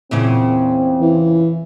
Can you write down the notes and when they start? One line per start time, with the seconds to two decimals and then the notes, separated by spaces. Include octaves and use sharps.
0.11 E2 A#2 C#3 C4
1.01 E3